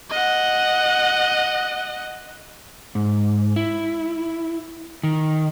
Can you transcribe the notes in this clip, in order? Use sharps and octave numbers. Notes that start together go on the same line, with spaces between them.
D#5 F#5
G#2
E4
D#3